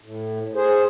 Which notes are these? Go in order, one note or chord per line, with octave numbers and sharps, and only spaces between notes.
A2
G#4 C5